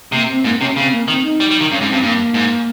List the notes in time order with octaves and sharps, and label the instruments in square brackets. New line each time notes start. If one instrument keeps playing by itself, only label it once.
[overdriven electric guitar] C3 [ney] A#3
[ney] C4
[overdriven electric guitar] G#2 [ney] A#3
[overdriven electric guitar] C3 [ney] C#4
[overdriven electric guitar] C#3 [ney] C4
[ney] A#3
[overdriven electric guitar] D#3 [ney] C4
[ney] D#4
[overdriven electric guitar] G3
G3
D#3
[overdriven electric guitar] G2 [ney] C#4
[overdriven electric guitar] G#2
[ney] C4
[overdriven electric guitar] G2
[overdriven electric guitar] G2 [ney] A#3
[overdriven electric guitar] G#2